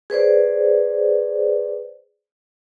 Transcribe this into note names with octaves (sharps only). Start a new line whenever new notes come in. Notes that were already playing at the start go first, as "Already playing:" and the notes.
G#4 B4 C5 D5